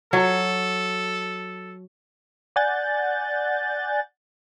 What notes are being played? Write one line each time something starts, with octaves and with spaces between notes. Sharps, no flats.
F#3 A4
D5 F#5 G#5 F#6 G6 A6